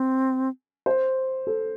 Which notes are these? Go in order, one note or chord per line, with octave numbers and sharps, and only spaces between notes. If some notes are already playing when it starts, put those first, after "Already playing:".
Already playing: C4
C5
A4